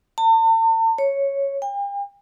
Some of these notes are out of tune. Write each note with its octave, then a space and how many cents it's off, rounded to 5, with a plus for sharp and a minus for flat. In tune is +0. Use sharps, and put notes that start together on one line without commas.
A5 +45
C#5 -5
G5 +40